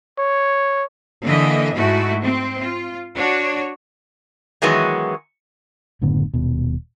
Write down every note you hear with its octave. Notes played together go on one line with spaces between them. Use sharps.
C#5
D3 E3 A#3 D#5 E5
G#2 A3 E4 F#4
C4
F4
D4 F#4 C#5
D#3 E3 F#3 G#3 B3
F#1 A2 D3 B3
D#1 B2